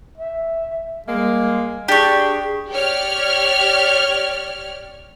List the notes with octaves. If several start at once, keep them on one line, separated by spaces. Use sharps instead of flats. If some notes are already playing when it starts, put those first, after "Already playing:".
E5
G3 G#3 A#3
D4 G4 G#4 C#6
G4 C#5 D5 F6